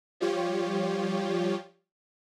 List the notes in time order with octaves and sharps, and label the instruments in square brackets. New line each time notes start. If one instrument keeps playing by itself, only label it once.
[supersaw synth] F3 G3 F4 G4 C#5